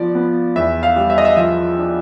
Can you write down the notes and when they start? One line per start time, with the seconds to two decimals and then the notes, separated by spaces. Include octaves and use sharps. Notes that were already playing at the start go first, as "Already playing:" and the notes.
Already playing: F3 B3 D5
0.15 B3
0.56 E2 E5
0.83 F5
0.96 G3
1.10 E5
1.18 D#5
1.25 E5
1.37 F3 E5
1.78 D4